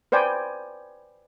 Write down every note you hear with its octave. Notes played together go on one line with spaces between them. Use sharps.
B4 C5 D5 G5 G#5